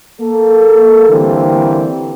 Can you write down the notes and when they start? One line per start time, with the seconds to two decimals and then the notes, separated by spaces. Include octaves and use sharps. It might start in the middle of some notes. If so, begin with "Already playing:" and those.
0.21 A#3 A4
1.10 D3 E3 G3 A#3 C4